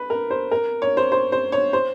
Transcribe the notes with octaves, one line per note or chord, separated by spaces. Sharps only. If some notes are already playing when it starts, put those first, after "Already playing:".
Already playing: B4
A#4
C5
A#4
C#5
C5
C5
C5
C#5
C5